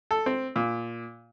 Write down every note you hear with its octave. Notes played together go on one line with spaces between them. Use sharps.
A4
C4
A#2